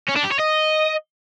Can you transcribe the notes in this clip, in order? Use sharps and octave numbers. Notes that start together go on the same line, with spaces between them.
C#4
D4
G4
C#5
D#5